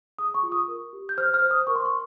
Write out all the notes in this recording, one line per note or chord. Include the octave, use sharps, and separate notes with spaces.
G#4 D#6
C#6
F4
D#6
A#4
G4
G6
C5 F6
F6
C5
D#6
A#4 C#6
C6
C#6